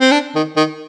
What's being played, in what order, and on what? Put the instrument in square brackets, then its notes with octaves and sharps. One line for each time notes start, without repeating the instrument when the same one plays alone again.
[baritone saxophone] C4
D4
D#3
D#3